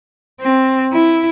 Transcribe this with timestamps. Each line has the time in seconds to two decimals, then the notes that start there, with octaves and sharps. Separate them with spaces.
0.41 C4
0.93 E4